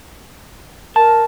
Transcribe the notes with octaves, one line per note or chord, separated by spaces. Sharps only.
A#4 A5